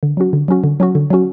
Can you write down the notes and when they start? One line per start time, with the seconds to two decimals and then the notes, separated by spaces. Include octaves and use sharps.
0.03 D3
0.17 F#3 C#4 F#4
0.33 D3
0.48 F#3 C#4 F#4
0.64 D3
0.80 F#3 C#4 F#4
0.95 D3
1.10 F#3 C#4 F#4